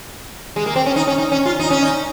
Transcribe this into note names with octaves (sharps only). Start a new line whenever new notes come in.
G#3
A#3
C4
C#4
D#4
C#4
D#4
C#4
F4
D#4
C#4
D#4